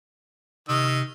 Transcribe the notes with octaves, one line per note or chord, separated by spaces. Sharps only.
C3 D#3 D#5 E6